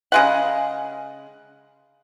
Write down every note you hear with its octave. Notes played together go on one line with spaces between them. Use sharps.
C#3 G#3 F#5